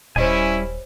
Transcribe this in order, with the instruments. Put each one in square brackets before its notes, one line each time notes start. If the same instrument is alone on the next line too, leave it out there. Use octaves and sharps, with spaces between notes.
[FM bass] D#1 [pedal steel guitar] G3 G#5 [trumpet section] C#4 E4 [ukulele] C5 C#5 D#5